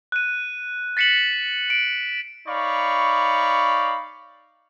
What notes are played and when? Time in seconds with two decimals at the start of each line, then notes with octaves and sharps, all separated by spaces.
0.12 F#6 D#7
0.97 A6 B6 C#7 E7 F#7
1.70 D7
2.48 D#4 C#5 D5 F5 B5 C#6